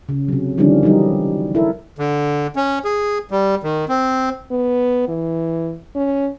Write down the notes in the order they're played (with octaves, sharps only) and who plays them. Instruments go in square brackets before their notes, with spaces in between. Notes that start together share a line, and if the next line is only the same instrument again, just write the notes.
[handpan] C#3
C3 F#3
D3 D#3 F3 G3 C#4 D4
E3 F#3 G3 D#4
E4 A4 A#4
[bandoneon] D3
C#4
G#4
G3
D#3
C4
[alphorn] B3
E3
C#4